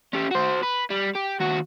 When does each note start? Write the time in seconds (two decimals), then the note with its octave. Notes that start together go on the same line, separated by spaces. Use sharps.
0.14 C#4 G4
0.31 F#4 C5
0.63 B4
0.91 G3
1.15 G4
1.40 D#2 F#4